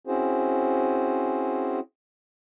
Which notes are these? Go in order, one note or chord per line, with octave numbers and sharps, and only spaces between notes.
C4 C#4 E4 F#4 G#4 C5